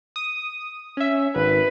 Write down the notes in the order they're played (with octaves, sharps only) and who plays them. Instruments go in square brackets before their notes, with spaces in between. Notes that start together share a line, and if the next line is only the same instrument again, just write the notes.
[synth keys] D#6
C#4 E5
[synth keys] G#1 [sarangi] B4